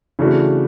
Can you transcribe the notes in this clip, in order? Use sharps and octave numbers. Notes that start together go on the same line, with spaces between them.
C#3 E3 A3 D4 F#4